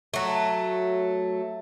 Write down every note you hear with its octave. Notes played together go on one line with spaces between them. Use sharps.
F#3 A3